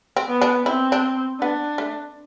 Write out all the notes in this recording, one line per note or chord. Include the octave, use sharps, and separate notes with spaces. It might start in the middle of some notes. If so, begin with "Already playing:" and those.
C4
B3
D4
C4 E4
D4
B3 D4
A3